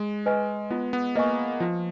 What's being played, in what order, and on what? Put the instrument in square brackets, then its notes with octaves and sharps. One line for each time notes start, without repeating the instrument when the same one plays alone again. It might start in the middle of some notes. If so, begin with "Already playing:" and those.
Already playing: [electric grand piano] G#3
[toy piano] B4 D#5 G#5 C#6
[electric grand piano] B3 [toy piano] F4
[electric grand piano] B3
[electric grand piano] A#3 [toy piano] B4 D#5 G#5 C#6
[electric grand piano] F3 [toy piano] F4